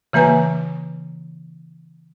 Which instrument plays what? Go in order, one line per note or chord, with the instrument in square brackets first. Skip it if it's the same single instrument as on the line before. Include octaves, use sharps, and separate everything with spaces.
[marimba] C#3 E3 A#3 B4 G#5